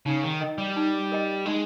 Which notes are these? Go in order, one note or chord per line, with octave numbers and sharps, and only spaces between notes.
C#3 D#4
D#3
A#4 D#5 G5
G3
D#4
A#4 D#5 G5
G#3 D#4